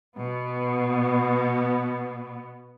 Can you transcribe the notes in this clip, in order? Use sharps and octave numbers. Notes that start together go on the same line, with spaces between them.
B2 B3